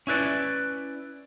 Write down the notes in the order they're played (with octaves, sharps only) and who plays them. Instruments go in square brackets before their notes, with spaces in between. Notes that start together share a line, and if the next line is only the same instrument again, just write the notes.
[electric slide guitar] C#4 E4 B4 D5